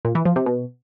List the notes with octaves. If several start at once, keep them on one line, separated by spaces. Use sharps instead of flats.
A#2
E3
F3
C3
B2